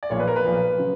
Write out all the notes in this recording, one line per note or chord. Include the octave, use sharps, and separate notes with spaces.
D5
B1 A#2 F3 C#5
B4
A#4
B4
B1 A#2 F3
C#3 F#3